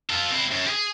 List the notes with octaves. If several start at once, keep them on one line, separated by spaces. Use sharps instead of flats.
F4 A4
C4 E4
F#2
G4 G#4